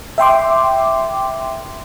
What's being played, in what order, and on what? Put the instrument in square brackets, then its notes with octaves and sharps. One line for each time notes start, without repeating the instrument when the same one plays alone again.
[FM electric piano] E5 G5 C6 D6